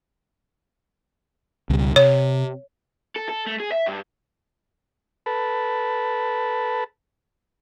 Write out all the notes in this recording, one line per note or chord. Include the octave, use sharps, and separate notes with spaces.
C#2 B2 G3
C3 C#5
A4
A4
A3
G#4
E5
G2
A4 B4 A5 B5